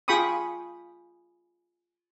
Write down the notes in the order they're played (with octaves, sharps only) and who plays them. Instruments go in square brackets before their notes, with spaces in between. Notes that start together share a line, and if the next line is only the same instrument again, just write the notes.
[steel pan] F4 G#4 G5 B5 C#6 D#6